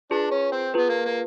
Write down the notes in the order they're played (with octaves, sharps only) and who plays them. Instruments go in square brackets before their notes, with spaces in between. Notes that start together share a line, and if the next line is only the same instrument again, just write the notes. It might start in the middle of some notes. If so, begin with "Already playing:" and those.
[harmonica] D4 [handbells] F4 G#4 B4
[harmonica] C#4
C4
[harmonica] B3 [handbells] F4 G#4 B4
[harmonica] A#3
A#3